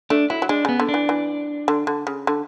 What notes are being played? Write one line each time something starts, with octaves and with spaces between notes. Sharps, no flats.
A3 D4
F#3 E4
F#3
G#3 D4
C#3 B3
D3
D4
E3
E3
D3
D3
C#3
D3